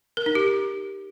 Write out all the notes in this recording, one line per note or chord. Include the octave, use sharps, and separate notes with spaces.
A#4
D#4
G4